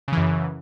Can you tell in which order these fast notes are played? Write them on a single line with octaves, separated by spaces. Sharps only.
C#3 E3 F#2